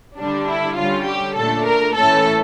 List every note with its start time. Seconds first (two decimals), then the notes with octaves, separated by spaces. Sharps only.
0.17 D3 G3 D4
0.47 E4
0.78 D3 G3 C#4 F4
1.07 G4
1.37 A#2 A3 D4 A4
1.66 A#4
1.96 A2 E3 A3 C#4 A4